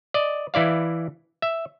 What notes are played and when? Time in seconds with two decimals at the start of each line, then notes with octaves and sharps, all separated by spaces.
0.14 D5 D#5
0.54 E3 E4 D5 F5
1.42 E5